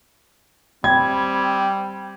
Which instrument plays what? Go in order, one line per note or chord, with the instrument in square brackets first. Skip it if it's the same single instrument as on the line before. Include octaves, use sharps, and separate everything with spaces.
[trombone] G3 [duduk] C4 [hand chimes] G5 B5 [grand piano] G#6